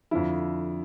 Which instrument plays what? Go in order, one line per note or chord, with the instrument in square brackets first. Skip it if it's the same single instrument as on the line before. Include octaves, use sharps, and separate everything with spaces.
[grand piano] F2 D3 F3 E4